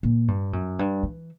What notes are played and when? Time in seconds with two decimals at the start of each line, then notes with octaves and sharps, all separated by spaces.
0.03 A#2
0.28 G2
0.53 F#2
0.79 G2
1.03 E3